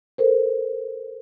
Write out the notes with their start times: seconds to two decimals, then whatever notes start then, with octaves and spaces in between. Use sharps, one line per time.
0.18 A4 A#4 C5